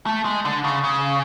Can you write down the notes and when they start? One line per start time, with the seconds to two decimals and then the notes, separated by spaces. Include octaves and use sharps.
0.06 A3
0.25 G#3
0.45 D3
0.64 C#3
0.84 C#3